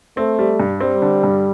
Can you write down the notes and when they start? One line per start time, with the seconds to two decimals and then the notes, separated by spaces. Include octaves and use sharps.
0.17 A3 C4
0.39 G3
0.60 G2
0.81 G3 C4
1.02 D3
1.24 G2